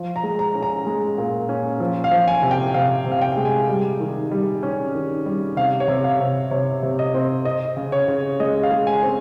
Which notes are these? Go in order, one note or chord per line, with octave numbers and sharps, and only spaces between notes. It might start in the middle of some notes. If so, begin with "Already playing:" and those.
Already playing: F3
A#5
G#3
A#5
C#4
A#5
G#3
A#2
C#4
F3
F5
F3
G#5
C3
G5
C3 F5
C3
F5
G5
G#3
G#5
G3
D#3
G3
C#4
D#3
G3
C3 F5
C#5
C3
F5
C3
C3 C#5
C3
D#5
C4
C4 D#5
C#3
C#5
C#3
G#3 D#5
F5
G#3
G#5
C4